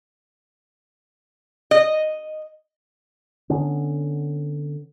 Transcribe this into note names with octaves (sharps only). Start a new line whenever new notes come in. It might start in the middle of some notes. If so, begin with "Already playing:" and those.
D#5
D3 B3 C#4